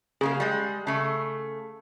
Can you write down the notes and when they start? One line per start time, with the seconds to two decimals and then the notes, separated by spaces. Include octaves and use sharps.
0.21 C#3 A#3 G#4 F5
0.40 G3 G#3
0.87 C#3 A3